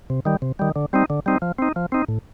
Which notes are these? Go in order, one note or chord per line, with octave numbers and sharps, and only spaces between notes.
C3
D#3 G3
C3
D#3 G3
D3
G3 C4 D#4
D3
G3 C4 D#4
F3
C4 D#4
F3
C4 D#4
A2